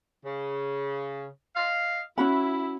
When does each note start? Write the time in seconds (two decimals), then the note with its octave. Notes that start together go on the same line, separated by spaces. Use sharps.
0.24 C#3
1.56 D#5 F5
2.18 C#4 E4 F#4 B5